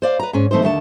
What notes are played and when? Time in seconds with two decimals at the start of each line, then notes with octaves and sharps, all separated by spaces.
0.02 C5 D5 F5
0.19 B4 A#5
0.33 G#2 C#4
0.51 E3 A3 C4 D#4 C5
0.62 D#2 D3 A3 A5